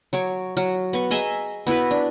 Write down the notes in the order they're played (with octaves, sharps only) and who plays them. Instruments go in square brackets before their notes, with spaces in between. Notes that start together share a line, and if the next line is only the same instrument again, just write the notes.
[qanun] F#3 C#5 D6
F#3
B3 C#6
G#4 D#5 E5 A#5
B3 E4 F#4 B4
D4